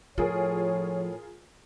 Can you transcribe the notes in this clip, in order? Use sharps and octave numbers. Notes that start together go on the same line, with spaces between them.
A2 F3 F4 G#4 A#4 C#5